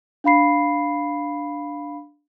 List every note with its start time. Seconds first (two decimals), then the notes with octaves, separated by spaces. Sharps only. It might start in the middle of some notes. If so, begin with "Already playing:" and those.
0.24 D4 F5 B5 C7